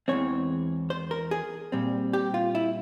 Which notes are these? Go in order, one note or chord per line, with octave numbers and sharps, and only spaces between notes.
E2 E3 G#3 C4 C#5
C5
A#4
G#4
A#2 G3 C4
G4
F4
E4